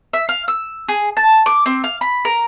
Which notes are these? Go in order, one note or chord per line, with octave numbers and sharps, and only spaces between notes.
E5
F5
E6
G#4
A5
D6
C4
F5
B5
A#4